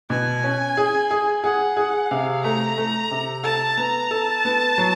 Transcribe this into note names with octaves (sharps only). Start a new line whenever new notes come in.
B2 G#5
C#4
G#4
G#4
G#4 F#5
G#4
C3 F5
A3 A#5
A3
C3
A4 A5
B3 A#5
A4 A5
B3
F#3